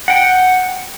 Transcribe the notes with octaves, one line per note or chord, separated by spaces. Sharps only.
F#5 G5